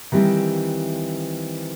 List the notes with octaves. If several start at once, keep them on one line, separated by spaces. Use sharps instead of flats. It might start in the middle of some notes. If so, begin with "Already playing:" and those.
D#3 E3 G3 C4